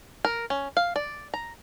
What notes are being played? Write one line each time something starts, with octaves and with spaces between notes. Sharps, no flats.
A#4
C#4
F5
D5
A#5